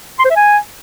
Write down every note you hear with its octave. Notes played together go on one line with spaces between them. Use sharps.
C6
C5
E5
G#5